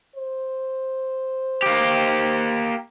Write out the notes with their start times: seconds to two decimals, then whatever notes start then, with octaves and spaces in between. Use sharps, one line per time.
0.16 C5
1.62 A#3 G4